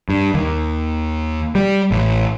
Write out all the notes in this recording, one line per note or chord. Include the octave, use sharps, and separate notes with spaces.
G2
D#2
G3
A1